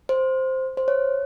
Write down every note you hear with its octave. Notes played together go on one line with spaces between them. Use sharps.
C5
C5
C#5